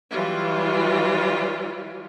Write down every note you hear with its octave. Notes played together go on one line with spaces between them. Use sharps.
E3 F#3 G3 F4